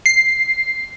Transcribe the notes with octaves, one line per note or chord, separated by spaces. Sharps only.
C7